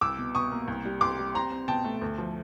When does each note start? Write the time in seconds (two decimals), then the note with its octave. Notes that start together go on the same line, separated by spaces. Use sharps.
0.01 C2 D6 E6
0.18 B2
0.35 B2 C#6 D#6
0.51 A#3
0.68 C2
0.85 G3
1.01 C2 C6 D6
1.19 G3
1.35 C4 A#5 C6
1.51 C4
1.68 B2 G5 A5
1.84 A3
2.01 D2
2.18 F3